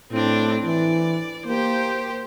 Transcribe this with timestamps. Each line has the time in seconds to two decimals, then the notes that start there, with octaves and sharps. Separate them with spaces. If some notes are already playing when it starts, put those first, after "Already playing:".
0.11 A2 C4 D4
0.65 E3 D5
1.46 A#3 G4 C5